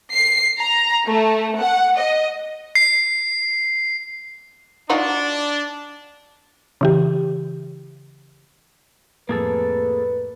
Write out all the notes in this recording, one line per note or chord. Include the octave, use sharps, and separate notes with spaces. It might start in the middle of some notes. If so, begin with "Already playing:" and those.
C7
A#5
A3
F#5
D#5
C7
D4 D#4 F4 F#4
C#3 E3 G4
F2 A2 A#3 G#4 A4 B4